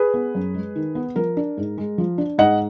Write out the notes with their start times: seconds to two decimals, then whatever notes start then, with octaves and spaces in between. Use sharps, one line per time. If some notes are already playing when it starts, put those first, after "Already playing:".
Already playing: G#4 B4
0.14 B3
0.35 F#2
0.54 G#3
0.76 D#3
0.95 B3
1.16 F3 A#4
1.37 D4
1.57 G#2
1.78 G#3
1.98 F3
2.18 D4
2.38 G#2 D#5 F#5